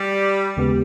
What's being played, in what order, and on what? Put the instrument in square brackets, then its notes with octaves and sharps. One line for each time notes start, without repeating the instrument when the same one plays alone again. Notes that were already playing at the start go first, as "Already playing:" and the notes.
Already playing: [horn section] G3
[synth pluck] D#2 C#3 G#3 B3 G4